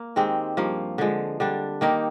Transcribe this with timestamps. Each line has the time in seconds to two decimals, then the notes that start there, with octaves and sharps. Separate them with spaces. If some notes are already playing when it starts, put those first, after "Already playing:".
Already playing: A#3
0.16 D#3 G#3 C4 G4
0.57 G2 F3 A#3
0.98 D3 F3 G#3
1.40 D3 G3 D4
1.81 D#3 A#3 D#4 G4